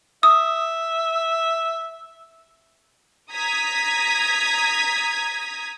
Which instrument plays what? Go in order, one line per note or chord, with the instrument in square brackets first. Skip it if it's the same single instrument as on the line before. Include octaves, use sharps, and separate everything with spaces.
[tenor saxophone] E5 [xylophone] D#6
[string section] A#5 D#6 G#6 B6